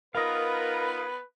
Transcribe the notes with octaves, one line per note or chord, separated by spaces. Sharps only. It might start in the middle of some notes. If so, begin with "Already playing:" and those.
B3 D#4 F4 A#4 B4 D#5 F5